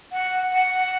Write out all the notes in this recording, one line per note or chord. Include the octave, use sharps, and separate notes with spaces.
F#5
F#5